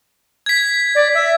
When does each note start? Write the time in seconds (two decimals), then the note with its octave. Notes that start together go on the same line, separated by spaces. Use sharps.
0.46 G#6 B6
0.95 D5
1.15 E5